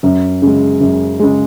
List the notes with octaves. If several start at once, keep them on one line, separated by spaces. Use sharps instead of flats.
F#2
C#3 G#3
F#2
C#3 G#3